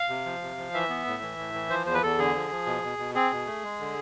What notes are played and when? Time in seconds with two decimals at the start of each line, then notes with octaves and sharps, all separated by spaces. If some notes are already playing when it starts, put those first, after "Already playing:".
Already playing: F5
0.09 C3
0.25 F3
0.42 C3
0.58 F3
0.74 E3 E5
0.89 B3
1.07 A2
1.22 E3
1.38 A2
1.54 E3
1.70 F3 C5
1.86 E2 C5
1.94 B4
2.03 E2 A4
2.19 D3 G#4
2.35 F3
2.51 F3
2.66 B2
2.83 B2
2.98 B2
3.15 C4 G#4
3.31 B2
3.47 A3
3.63 G#3
3.80 D3